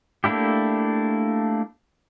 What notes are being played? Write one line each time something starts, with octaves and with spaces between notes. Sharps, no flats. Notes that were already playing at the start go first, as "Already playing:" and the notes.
A3 A#3 D4 E4 G4